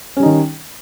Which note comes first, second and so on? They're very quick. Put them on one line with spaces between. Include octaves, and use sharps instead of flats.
C#4 G3 D#4 D#3